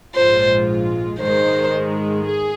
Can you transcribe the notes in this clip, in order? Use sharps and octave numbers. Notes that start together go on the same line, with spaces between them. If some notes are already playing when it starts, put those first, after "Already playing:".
A#1 G#2 G#3 F4 C5
G#2 D#3 G#3 C5
G#4